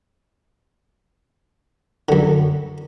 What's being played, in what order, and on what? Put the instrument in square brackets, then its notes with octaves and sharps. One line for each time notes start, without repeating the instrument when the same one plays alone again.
[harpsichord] F#2 D3